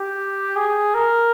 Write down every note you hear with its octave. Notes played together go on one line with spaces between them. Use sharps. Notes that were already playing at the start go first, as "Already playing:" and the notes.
Already playing: G4
G#4
A#4